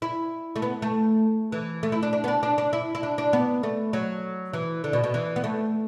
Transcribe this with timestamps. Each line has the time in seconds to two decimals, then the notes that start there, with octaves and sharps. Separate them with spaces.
0.02 E4
0.56 A3
0.62 B3
0.82 A3
1.52 E3
1.83 A3
1.92 E4
2.03 D4
2.13 D4
2.24 B3
2.28 D4
2.43 D4
2.58 D4
2.73 E4
2.95 E4
3.03 D4
3.18 D4
3.33 B3
3.63 A3
3.93 F#3
4.53 E3
4.84 D3
4.93 B2
5.04 B2
5.14 E3
5.36 B3
5.44 A3